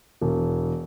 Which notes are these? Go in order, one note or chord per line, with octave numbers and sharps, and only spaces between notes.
E1